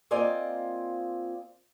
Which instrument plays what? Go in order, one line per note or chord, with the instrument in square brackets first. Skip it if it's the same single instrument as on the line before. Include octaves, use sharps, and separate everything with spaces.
[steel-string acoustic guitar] A#3 C4 F4 D5 D#5 G#5